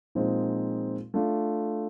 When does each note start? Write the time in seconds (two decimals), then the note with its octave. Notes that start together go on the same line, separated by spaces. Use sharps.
0.15 A#2 F3 G#3 C4 D#4
1.14 A3 D4 F4